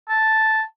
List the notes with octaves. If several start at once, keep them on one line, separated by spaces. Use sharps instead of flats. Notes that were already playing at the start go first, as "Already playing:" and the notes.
A5